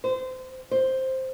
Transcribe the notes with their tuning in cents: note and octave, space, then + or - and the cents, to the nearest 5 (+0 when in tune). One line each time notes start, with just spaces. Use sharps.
C5 -25
C5 +5